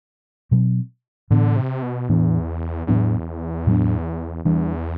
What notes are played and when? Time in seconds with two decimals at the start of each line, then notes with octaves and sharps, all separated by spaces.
0.51 B2 F#3 C4
1.30 A2 D3 E3 B3 D4
1.56 C3
1.82 B2
2.09 E2 A2 E3 B3 D4
2.87 E2 A2 F#3 B3 D4
3.67 A2 F#3 B3 D4
4.45 E2 E3 G3 D4